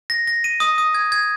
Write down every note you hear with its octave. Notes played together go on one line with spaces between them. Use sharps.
A#6
A#6
D#7
D#6
D#6
G#6
G#6